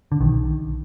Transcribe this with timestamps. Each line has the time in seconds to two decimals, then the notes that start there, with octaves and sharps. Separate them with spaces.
0.12 D3
0.20 B1 D#3